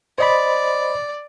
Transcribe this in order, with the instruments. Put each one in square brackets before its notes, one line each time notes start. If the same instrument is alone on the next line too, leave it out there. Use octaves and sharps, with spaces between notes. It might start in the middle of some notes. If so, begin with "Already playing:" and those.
[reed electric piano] C5 D#5 B5 [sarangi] D5